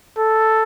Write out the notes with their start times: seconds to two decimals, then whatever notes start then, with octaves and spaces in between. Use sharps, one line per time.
0.18 A4